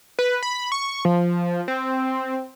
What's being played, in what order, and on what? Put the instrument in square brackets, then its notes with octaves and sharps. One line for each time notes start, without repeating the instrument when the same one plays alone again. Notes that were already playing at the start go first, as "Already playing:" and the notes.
[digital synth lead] B4
B5
C#6
F3
C4